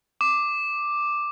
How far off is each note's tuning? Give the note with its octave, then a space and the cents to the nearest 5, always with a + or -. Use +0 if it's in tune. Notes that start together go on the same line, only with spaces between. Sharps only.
D6 +5